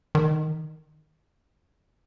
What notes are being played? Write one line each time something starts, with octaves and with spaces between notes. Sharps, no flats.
D#3